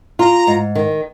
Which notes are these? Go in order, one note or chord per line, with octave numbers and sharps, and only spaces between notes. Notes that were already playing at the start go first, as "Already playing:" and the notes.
F4 A#5
G#2
D#3